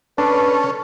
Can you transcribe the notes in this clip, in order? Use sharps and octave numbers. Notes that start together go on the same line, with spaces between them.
C#4 D4 A4 B4